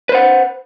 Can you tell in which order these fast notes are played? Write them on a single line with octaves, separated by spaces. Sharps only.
B4 C5 F#5